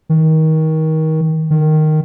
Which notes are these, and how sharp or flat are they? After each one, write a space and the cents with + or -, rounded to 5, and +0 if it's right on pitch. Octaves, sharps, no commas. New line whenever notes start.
D#3 +25
D#3 -10